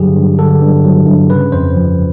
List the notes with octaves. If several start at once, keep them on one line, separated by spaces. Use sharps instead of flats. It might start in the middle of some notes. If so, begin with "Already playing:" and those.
Already playing: G2 D3 F#3 G4 G#4
G2
D3 A4
G2
F#3
G2
C#3 B4
F2 C5
F3